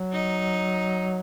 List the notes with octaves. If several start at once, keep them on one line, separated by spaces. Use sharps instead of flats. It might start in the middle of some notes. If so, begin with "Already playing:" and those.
Already playing: F#3
D#4